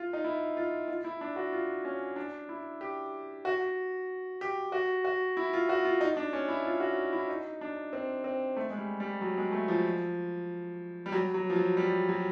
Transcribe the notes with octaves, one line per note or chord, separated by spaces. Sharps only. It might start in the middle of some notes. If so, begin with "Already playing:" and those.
Already playing: F4
D#4
E4
F4
F4
E4
D4
F#4
F4
C#4
D4
E4
G4
F#4
G4
F#4
F#4
E4
F4
F#4
F4
D#4
D4
C#4
E4
F4
F#4
E4
D#4
D4
C4
C4
A3
G#3
G3
G3
F#3
G#3
A3
F3
G3
F#3
F#3
F3
F#3
G3
F#3